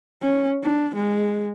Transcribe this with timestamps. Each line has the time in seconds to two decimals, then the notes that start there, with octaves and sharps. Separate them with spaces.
0.22 C#4
0.64 D4
0.95 G#3